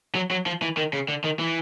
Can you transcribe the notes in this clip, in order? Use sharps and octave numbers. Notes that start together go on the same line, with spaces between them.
F#3
F#3
F3
E3
D#3
C#3
D3
D#3
E3